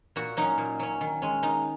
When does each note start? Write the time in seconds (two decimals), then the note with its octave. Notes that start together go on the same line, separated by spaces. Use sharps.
0.16 A#2 F#4
0.37 F#3 C#4 D#4
0.58 A#2
0.79 F#3 C#4
1.01 D#3
1.22 G#3 C#4
1.43 D#3 D#4